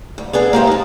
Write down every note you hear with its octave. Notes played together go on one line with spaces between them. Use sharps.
D2
B3 D4 G#4 A4
A#3 G4 C5 E5
D#4 A5